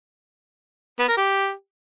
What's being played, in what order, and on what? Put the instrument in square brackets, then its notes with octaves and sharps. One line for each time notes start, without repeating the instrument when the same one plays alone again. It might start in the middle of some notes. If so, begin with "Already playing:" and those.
[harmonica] B3
A#4
G4